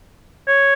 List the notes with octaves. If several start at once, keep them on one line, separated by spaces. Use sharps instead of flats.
C#5